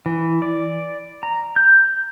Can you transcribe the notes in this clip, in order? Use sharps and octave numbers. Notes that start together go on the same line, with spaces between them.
E3
D5
A#5
G6